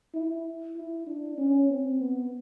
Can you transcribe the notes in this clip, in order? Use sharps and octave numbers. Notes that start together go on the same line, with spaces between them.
E4
E4
D4
C#4
C4
B3